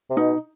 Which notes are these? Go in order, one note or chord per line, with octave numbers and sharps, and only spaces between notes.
C3
B2 D#4